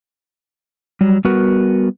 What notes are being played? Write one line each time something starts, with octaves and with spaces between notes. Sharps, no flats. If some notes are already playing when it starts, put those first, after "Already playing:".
F#3 G3
G3 B3 F#4 A#4 B4